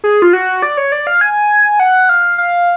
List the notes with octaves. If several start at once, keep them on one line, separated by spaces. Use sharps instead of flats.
G#4
F4
F#4
D5
C#5
D5
F5
G#5
F#5
F5
F5